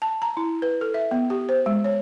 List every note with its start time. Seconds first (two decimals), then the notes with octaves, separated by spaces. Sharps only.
0.02 A5
0.22 A#5
0.37 E4
0.62 B4
0.81 A4
0.94 E5
1.11 B3
1.30 G4
1.49 C5
1.66 G#3
1.84 C#5